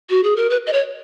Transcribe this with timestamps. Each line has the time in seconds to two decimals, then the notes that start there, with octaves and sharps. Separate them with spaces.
0.10 F#4
0.23 G#4
0.36 A#4
0.50 B4
0.67 D#5
0.73 C#5